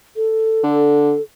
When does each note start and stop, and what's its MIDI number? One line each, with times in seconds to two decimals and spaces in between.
0.16 1.21 69
0.64 1.14 50